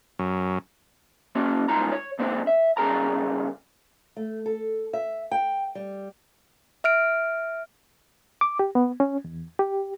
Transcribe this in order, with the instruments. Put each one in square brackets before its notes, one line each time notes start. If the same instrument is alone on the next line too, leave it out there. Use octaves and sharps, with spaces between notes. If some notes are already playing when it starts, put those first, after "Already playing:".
[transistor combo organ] F#2
[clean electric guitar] A#3 C#4 F#4 C#5
C2 G#3 D#4 F4 A#5
C#5
G#2 A#3 C4 D4
E5
G2 C#3 G#4 A#4 A#5
[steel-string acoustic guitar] A3
A4
E5
G5
G3
[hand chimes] E5 F6 D7
[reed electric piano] D6
G4
B3
C#4
E2
G4